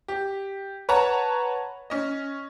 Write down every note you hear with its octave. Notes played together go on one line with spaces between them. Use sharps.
G4
B4 C#5 F#5 A5 A#5
C#4 D#5